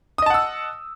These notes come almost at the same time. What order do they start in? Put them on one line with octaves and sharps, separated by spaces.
D#6 D#5 A5 F#5 E6